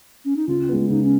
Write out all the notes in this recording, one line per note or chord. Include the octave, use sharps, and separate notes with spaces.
C#4
D#4
C#3 F4
G#3 B3
C#3 D#4
C#4